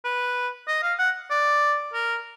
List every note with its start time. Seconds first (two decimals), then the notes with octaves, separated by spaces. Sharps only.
0.05 B4
0.68 D#5
0.83 F5
0.99 F#5
1.31 D5
1.94 A#4